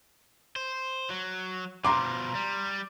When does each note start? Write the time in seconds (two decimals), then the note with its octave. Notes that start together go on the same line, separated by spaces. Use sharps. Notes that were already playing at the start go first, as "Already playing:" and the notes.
0.56 C5
1.10 F#3
1.85 B2 F3 A#5 C6 D6
2.35 G3